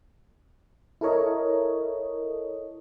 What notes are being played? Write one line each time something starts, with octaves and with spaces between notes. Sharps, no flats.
E4 A4 A#4 C#5 D#5